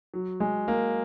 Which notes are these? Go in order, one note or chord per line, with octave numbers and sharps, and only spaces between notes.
F#3
G#3
A#3